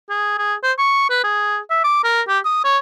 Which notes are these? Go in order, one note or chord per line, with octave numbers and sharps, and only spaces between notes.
G#4
G#4
C5
C#6
B4
G#4
E5
D6
A#4
G4
D#6
C#5